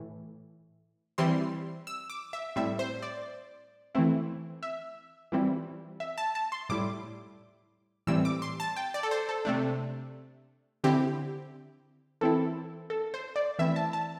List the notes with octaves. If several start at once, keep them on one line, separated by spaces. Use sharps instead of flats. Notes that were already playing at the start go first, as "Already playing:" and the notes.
Already playing: A2 E3
E3 G3 C4 E4 C6
E6
D6
E5
A2 G3 C4 E4 E5
C5
D5
E3 A3 C4 E4
E5
E3 G3 C4 E4
E5
A5
A5
C6
A2 G3 E4 D6
A2 E3 G3 C4 E4 E6
D6
C6
A5
G5
D5
A4
C5
A4
C3 A3 D4
D3 C4 E4 G4
E3 C4 E4 A4
A4
C5
D5
E3 A3 C4 E4 E5
A5
A5